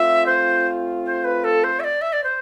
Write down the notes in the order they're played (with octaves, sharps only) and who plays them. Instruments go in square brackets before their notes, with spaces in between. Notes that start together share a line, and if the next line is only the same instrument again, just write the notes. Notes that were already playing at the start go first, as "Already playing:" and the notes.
Already playing: [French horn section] A3 C4 F4 [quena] E5
[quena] C5
C5
B4
A4
C5
E5
D5
E5
D5
C5